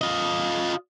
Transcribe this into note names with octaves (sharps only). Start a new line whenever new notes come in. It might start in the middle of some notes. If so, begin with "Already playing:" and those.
F4 D#5